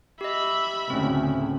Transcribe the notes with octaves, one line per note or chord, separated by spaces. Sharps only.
G4 D#5 E5 B5
D2 A2 C#3 C4 C#4